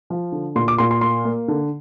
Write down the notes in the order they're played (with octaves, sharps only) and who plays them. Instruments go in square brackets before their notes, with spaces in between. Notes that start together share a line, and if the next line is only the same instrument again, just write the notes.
[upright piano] F3
D3
A#2 C6
D6
A#2 C6
C6
A#3 C6
A#3
D3